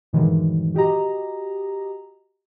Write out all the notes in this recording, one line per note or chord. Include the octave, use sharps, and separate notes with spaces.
G2 A#2 D#3 E3 F#3 G#3
F#4 G4 D#5 A#5